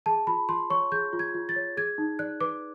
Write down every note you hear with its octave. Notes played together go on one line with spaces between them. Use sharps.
G#4 A5
F4 B5
F4 C6
C#5 C#6
G#4 G6
F4
G#6
F4
A6
C#5
G#4 G#6
D#4
D5 F#6
B4 D6